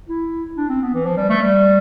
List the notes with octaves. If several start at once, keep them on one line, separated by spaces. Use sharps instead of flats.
E4
D4
C4
B3
E3
F3
G3
A3
G3